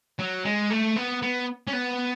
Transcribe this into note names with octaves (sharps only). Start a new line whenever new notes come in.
F#3
G#3
A3
B3
B3
C#4
B3